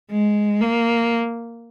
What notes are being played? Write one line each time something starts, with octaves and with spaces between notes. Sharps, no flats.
G#3
A#3